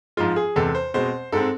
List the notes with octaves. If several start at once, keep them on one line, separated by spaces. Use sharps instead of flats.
G#2 F3 G#3 F4
G#4
E2 C3 G#3 A4
C5
B2 G#3 C4 C5
G#2 G#3 C4 A4